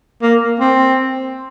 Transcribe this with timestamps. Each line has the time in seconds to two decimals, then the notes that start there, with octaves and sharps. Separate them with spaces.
0.22 A#3
0.60 C4